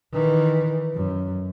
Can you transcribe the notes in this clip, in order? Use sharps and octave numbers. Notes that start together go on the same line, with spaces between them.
D#3 E3
F#2